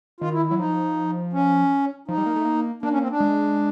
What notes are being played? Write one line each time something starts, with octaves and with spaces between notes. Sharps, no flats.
D#3 F4
E4
E4
F#3
F3 D#4
C#4
F3 D#4
G3
A#3
A3
A#3
A#3 D4
C#4
C4
D4
G#3